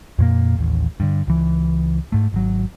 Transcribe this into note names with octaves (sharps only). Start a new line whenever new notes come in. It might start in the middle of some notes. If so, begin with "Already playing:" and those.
F2 A#2 A#3
A1 D#2
G2 D3
C#2 E3
G#2 A3
G#1 F#3